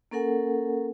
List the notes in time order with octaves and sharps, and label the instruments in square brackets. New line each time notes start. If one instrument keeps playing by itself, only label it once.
[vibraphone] A#3 C#4 A4 A#4 F#5 G#5